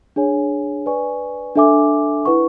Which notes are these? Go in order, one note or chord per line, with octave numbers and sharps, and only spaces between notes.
D4 G#4 C#5 G#5
B4 D5 G#5 C#6
D4 A4 E5 G#5 D6
E4 B4 F#5 C#6